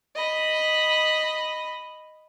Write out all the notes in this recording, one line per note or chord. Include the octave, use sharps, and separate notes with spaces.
D#5 B5